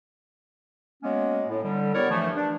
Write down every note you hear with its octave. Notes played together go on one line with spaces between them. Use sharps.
F#3 G#3 A#3 B3 C#4
A2
D3 G3
G3 B3 E4 A#4 C#5 D5
G2 E3 F3 A3
D4